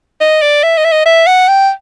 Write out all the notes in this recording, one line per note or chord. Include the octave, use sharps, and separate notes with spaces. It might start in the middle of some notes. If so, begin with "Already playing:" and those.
D#5
D5
E5
D#5
E5
D#5
E5
F#5
G5